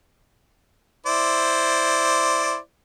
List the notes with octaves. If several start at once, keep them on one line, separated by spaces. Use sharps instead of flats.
E4 C5 D5